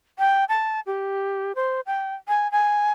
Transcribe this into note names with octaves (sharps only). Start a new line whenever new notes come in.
G5
A5
G4
C5
G5
G#5
G#5